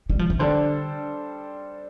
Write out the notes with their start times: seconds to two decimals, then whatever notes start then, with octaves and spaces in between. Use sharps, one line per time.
0.10 G3
0.19 F3
0.30 E3
0.39 D3 G3 D4 A4 C5